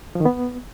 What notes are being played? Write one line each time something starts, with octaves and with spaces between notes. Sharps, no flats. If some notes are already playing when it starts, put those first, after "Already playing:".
F3
D#3
B3